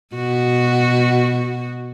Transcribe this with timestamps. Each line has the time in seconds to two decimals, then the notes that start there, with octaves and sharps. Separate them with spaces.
0.15 B2 F#4